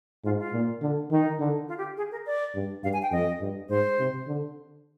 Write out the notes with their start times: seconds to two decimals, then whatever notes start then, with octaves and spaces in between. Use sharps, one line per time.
0.24 G#2 F4
0.39 F4
0.53 A#2
0.82 D3
1.11 D#3 D#4
1.40 D3
1.68 F4
1.78 G4
1.97 G#4
2.12 A#4
2.26 D5
2.55 G2
2.84 G2 F5
2.93 G#5
3.02 G5
3.12 F2 D#5
3.40 G2
3.70 G#2 C5
3.99 C3
4.27 D3